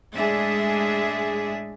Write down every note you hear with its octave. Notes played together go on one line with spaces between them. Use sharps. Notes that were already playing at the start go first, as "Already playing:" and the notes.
A2 G#3 D4 G#4 E5